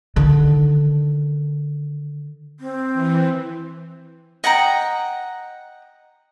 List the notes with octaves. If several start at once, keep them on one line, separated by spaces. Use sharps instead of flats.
D3 D#3
C4
E3
D#5 F#5 G5 A#5